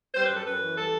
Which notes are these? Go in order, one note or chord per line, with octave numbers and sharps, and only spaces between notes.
G3 C5
F#2 B4
A4
F#2 B4
E3
G3 A4